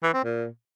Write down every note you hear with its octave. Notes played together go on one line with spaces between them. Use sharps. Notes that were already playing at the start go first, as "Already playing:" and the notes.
E3
C4
A#2